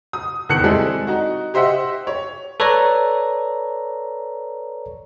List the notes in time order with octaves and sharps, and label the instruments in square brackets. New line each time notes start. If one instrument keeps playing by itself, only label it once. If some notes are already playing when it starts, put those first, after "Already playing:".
[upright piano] D#6
E2 D#3 F#6 C#7 F#7
G3 G#3 C4 E4 G#4 A4
D#4 F#4
G4 C5 D#5 E5 F#5
C#5
[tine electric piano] A4 B4 C#5 D5 A#5